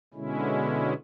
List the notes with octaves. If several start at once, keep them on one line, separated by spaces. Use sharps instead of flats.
B2 D3 G#3 C#4 E4